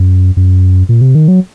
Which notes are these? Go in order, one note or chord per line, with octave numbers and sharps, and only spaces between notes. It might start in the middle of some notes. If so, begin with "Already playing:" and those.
Already playing: F#2
F#2
A#2
C3
D#3
F#3